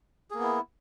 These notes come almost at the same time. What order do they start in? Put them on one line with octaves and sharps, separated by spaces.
G#4 A#3 B3 E4